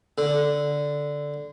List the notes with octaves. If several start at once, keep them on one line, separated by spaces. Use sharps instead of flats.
D3